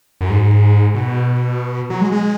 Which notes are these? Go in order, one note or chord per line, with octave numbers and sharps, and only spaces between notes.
F#2
G#2
B2
F#3
G#3
G#3